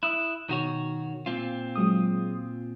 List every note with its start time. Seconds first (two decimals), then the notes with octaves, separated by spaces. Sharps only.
0.03 E4 D#6 F#6
0.49 B2 D#3 F#4 C#5
1.26 A#2 C4 F4
1.76 F#3 G#3 D#6